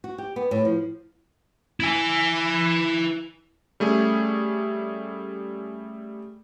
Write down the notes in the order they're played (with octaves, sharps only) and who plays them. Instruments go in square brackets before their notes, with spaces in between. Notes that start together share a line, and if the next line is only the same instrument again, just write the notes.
[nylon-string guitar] F#4
G4
B3
A2
F3
[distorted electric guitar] E4 G#5
[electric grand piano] G3 A3 C#4 G#4